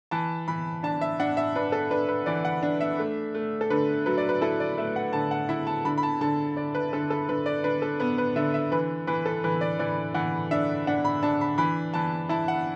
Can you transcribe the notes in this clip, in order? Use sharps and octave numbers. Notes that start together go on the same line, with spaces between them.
E3 A5
E3 B5
D4 A5
E5
D4 F#5
E5
D4 B4
A4
D4 B4
B4
E3 D5
F#5
D4
E5
A3
A3
A4
D3 B4
F#3 B4
D5
B4
E4 A4
D5
A3 E5
F#5
D3 A5
F#5
E4 E5
A5
D3 B5
B5
A5
D3 A5
D3 D5
B4
D3 A4
A4
D3 B4
D5
D4 B4
A4
B3 B4
B4
D3 E5
E5
E3 B4
E3 B4
A4
E3 B4
D5
E3 D5
E3 F#5
D4 E5
D4 F#5
B5
D4 A5
B5
E3 B5
E3 A5
E4 A5
F#5